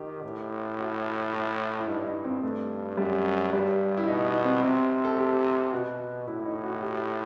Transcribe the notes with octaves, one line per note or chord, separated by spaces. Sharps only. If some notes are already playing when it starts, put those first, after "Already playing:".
Already playing: D#3 G4
A2
F#4
E4
E4
G2 D#4
D#4
C4
G2 A3
F#2 G3
G2 G3
E4
B2 D#4
D#4
C4
C3 C4
A4
G4
B2 F#4
A2 E4
E4
D#4
F#4
G4